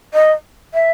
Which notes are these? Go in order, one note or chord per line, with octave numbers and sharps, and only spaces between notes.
D#5
E5